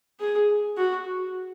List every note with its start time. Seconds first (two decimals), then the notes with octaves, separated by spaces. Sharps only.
0.20 G#4
0.77 F#4